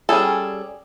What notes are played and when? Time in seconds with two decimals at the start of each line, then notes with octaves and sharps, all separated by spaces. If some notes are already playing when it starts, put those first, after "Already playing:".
0.09 G3 C#4 G#4 A4